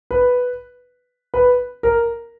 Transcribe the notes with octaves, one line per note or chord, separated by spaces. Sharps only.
B4
B4
A#4